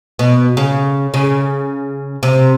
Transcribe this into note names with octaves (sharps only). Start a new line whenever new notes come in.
B2
C#3
C#3
C3